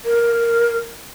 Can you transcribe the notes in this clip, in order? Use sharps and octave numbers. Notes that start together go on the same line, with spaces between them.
A#4